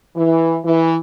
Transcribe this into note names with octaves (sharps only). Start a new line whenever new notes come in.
E3
E3